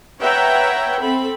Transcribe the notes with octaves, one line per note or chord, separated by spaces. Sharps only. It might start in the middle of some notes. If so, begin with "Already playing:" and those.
B4 C#5 E5 F#5 G5 A#5
C4 A4 B5